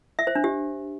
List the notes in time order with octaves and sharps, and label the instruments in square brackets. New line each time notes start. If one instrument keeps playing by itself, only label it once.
[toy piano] E5
C5
D4
G4